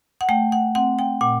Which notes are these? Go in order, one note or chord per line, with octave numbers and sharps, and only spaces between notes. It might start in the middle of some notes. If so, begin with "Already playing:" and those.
F#5
A3 G5
F#5
C4 F#5
G5
A#2 F#5